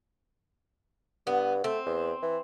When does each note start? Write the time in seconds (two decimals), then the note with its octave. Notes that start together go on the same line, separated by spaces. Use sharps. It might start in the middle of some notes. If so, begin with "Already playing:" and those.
1.27 G2 B3
1.64 A3 C4
1.86 E2
2.22 E3